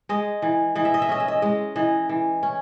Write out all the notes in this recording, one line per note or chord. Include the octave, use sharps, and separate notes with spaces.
G#3 D#5
E3
E3 D#5
E5
D#5
E5
C#4 D#5
E5
D#5
G#3 D#5
E3 D#5
E3
C#4